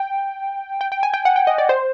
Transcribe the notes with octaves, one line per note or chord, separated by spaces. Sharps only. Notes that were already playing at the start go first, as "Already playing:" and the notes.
Already playing: G5
G5
G5
G#5
G5
F#5
G5
D#5
D5
C5